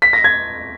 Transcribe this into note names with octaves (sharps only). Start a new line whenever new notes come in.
B6
A#6
G#6